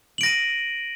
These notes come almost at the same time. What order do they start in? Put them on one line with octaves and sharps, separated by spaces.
F#7 D7 A#6 D#7